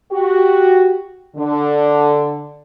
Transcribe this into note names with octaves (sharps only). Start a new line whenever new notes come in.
F#4 G4
D3